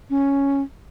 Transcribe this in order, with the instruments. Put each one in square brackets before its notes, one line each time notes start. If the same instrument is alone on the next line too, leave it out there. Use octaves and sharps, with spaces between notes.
[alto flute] C#4